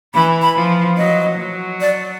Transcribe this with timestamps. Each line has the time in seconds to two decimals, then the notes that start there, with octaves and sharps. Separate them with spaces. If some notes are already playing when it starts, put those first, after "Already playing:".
0.14 E3 B5
0.42 B5
0.56 F3
0.97 F#3 D#5
1.38 F#3
1.81 D5